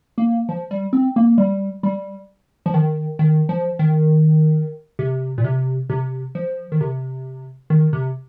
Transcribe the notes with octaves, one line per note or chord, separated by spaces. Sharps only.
A#3
F3
G3
C4
A#3
G3
G3
F3
D#3
D#3
F3
D#3
C3
A#2
C3
C3
F3
D#3
C3
D#3
C3